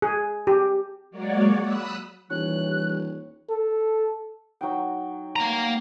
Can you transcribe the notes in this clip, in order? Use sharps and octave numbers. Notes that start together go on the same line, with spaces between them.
G#4
G4
F#3 G#3 A#3 F#4 C#5 D5
B5 D#6 E6 F#6
D#1 E3 G3 C#5 F#6
A4
F#3 D#4 G5
A#3 A#5